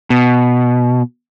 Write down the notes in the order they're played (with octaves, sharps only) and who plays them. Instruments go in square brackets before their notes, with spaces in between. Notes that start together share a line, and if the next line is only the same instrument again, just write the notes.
[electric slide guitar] B2